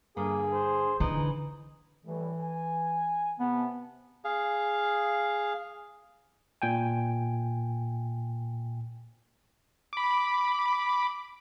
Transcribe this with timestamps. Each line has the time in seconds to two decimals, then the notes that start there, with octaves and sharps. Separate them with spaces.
0.17 G2 D3 A#3 G#4
0.53 C5
1.00 D3 E3 D#4
2.05 A2 E3 G3 A3
2.41 G#5
3.40 C3 B3 A5
4.24 G#4 F5
6.62 A#2 G5 G#5
9.93 B5 D6